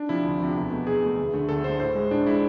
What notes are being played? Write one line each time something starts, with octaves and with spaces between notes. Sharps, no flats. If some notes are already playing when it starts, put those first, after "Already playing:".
Already playing: D4
C3 F3 E4
D2
C3 F3
E2
B2 A3
E2 G#4
B2 A3
D2
D3 A3
D2 A4
D3 A3 C5
A2 C5
G#3
A2 D4
G#3 E4